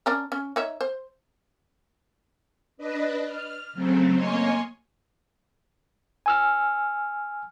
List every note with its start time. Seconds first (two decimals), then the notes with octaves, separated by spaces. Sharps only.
0.06 C#4 D4 A#4
0.32 C#4
0.56 D#4 C#5 E5
0.81 C5
2.77 D4 B4 D#5
3.25 F6
3.73 C#3 F#3 A3 C4
4.14 A#3 C#5 D#5 G#5 C6 C#6
6.26 G#5 E6 F6